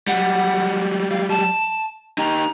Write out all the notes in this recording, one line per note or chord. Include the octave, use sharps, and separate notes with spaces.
F#3 G3 F#5
F5
A5
D#4 G4 A#5